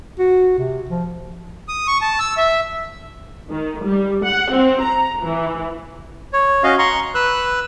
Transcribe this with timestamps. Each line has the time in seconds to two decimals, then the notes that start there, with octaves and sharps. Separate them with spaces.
0.19 F#4
0.59 C3
0.89 F3
1.69 D#6
1.87 C#6
2.02 A5
2.20 E6
2.38 E5
3.52 D#3
3.84 G3
4.25 F#5
4.55 C4
4.85 A#5
5.23 E3
6.33 C#5
6.63 C#4 F#4 D#5 F5
6.78 A#5 C6 C#6
7.15 B4 E6 F#6